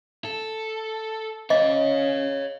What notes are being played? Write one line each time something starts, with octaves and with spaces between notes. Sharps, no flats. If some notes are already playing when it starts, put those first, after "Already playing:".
A4
C#4 C#5 D#5 F5